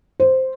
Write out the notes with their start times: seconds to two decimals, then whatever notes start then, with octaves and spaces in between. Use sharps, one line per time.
0.20 C5